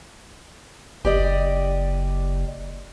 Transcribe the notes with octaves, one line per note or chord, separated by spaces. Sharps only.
F#1 G4 D5 D#5